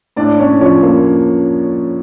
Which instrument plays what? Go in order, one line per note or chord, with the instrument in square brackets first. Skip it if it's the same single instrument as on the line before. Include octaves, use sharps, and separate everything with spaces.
[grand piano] A2 D4 D5
A2 C#4 C#5
F3 C#4 C#5
A#3